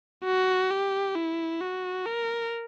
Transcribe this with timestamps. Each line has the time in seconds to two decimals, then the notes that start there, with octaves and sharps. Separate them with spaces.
0.25 F#4
0.70 G4
1.15 E4
1.61 F#4
2.06 A#4